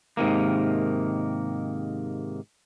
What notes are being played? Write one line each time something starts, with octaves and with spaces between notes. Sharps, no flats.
G#2 C3 D#3 A#3